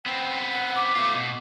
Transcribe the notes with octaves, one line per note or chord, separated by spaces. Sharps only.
B3 C4 G5
F#5
D6
A3 F4
B2